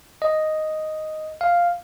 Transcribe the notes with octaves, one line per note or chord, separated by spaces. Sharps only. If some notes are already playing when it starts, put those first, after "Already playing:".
D#5
F5